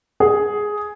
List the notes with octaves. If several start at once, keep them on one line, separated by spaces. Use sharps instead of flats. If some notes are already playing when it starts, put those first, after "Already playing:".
G#4